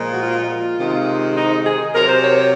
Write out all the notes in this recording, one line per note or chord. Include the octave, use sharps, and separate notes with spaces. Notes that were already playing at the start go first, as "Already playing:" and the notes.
Already playing: A#2 F3 G#3
F#4
F4
C3 D#3 G#3
D#4
G#4
C3 F#3 A#4
C5
C#5
C#5